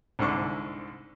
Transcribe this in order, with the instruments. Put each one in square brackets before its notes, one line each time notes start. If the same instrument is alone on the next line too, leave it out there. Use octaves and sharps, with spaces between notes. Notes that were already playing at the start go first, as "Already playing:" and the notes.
[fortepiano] C2 G#2 D3 C#6 D6